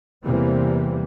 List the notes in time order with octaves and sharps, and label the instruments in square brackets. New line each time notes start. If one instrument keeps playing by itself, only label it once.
[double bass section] E2 C3 E3 G3 A#3 C4